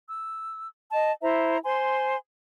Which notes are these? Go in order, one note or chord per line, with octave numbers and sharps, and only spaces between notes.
E6
D#5 A5
E4 C5 E5 A#5
C5 G#5 C6